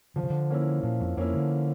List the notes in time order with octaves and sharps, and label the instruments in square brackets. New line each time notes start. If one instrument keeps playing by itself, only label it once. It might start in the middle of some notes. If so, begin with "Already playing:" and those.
[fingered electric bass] D3 [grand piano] F3
[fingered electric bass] C#3
D3
[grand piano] A#3 C#4 E4
[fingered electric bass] A#2 [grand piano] F3
[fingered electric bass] F2
[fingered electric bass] F2 [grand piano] A#3 C#4 E4
[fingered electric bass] D3